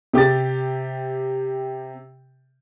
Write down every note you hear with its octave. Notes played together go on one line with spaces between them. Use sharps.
C3 G4 D6 A6